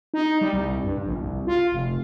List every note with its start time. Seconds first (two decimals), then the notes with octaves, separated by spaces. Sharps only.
0.14 D#4
0.41 G3
0.53 C2
0.84 G2
1.05 A#1
1.18 C2
1.47 F4
1.72 F1